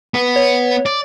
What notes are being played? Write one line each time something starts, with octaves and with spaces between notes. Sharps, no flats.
B3
C#5
D5